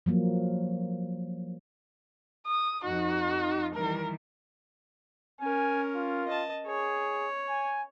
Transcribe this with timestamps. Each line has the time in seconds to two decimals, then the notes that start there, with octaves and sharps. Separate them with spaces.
0.06 F3 F#3 A#3
2.46 D#6
2.84 F2 D#4 F#4
3.75 D#3 E3 G3 A#4
5.41 C#4 A#4 G#5
5.96 F4
6.28 D#5 A5
6.67 G#4 C#5
7.49 G#5